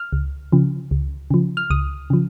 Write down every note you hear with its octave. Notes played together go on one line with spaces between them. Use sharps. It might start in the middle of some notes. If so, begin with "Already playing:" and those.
Already playing: F6
C#2
C#3 F3
C#2
C#3 F3
F6
C#2 D#6
C#3 F3